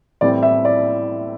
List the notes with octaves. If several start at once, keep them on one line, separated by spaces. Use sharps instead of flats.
A2 E3 G3 C4 D5
E5
D5